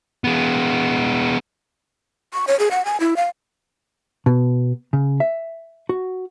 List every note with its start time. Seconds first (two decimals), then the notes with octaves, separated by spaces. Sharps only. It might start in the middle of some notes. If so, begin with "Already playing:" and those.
0.24 G#3 B3
2.33 C#6
2.47 C#5
2.59 G#4
2.71 F#5
2.85 G#5
3.00 E4
3.16 F5
4.26 B2
4.93 C#3
5.20 E5
5.89 F#4